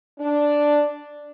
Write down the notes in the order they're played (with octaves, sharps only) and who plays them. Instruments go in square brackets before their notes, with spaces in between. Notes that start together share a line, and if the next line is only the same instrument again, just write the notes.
[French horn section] D4